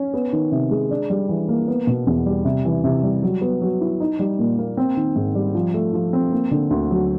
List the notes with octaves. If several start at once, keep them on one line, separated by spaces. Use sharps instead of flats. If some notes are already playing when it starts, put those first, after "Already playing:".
Already playing: C#4
B3
D#3
C3
G#3
D4
G3
E3
A#3
B3
B2
E2
G3
C3
E3
C3
G3
F#3
B3
F#3
E4
D#4
G3
A#2
A#3
C4
D#3
G#2
G3
F3
A3
F3
C4
A#3
D3
D2
F#3